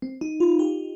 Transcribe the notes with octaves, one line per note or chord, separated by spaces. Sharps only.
C4
D#4
F4
G4